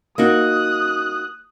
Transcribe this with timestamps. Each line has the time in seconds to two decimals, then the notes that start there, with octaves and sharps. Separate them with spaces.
0.18 A#3 D#4 F#4 D#6 F#6